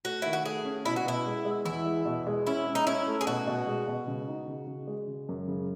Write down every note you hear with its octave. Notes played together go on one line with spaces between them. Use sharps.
A3 F#4
D#3 E4
F#4
A3 G#4
C#4
B2 E4
F#4
B2 E4
G#3
G#3
E2 E4
G#3
B2
G#3
C#4 E4
C#4
D#4
C#4 E4
A3
G#4
B2 F#4
B2
G#3
B2
C#3
D#4
C#3
C#3
G#3
C#3
F#2
C#3